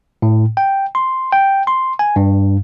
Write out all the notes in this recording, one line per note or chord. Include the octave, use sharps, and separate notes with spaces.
A2
G5
C6
G5
C6
G#5
G2